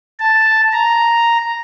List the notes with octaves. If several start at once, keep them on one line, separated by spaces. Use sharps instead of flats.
A5
A#5